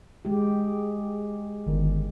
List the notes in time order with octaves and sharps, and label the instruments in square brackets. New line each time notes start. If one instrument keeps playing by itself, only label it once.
[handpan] G#3 G4
[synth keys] G1 D3 D#3